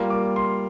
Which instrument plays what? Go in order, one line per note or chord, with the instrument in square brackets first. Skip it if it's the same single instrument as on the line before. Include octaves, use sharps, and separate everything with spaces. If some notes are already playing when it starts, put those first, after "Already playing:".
Already playing: [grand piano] G3 A#3 F4
D6
C6